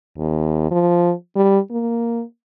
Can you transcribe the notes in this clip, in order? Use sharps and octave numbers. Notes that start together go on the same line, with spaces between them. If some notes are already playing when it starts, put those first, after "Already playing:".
D#2
F3
G3
A#3